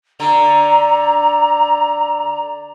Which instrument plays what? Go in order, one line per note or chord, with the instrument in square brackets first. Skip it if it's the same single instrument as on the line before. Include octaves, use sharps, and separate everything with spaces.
[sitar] D3 [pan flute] A#5